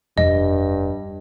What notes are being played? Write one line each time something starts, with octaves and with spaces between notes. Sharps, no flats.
F1 G2 D#5